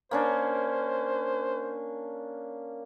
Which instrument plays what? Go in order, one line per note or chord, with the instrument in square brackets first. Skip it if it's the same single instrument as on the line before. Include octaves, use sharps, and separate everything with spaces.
[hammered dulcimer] A#3 C#4 D4 [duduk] C5